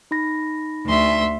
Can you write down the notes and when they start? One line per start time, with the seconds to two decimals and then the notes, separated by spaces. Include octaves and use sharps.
0.11 D#4 B5 A#6
0.85 D2 E5 C6